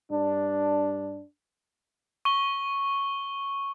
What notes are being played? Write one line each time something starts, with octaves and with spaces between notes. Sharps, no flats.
G2 D4
C#6 G7